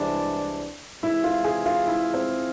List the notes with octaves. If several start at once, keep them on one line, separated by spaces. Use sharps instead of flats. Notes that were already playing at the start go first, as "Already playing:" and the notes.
Already playing: C2 C3 E3 G#3 D4
C3 E3 G#3 E4
F4
G#4
F4
E4
C4